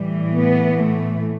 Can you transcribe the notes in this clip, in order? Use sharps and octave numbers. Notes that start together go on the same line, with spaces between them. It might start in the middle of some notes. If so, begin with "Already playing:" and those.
Already playing: A2 E3 G3
B3
A3